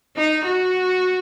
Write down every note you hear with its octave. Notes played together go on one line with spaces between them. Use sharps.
D#4
F#4